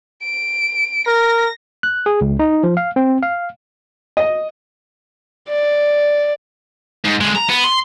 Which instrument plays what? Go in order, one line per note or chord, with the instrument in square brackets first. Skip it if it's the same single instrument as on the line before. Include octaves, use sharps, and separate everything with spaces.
[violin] D7
[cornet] A#4 [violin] A#6
[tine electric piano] F#6
G#4
C#2
D#4
F3
F5
C4
F5
[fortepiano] D#5
[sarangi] D5
[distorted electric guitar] G#2
D3 G#3
A#5
B3
C6